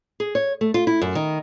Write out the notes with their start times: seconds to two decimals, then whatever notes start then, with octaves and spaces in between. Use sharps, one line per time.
0.20 G#4
0.35 C#5
0.61 A3
0.74 F4
0.87 E4
1.02 F#2
1.15 D#3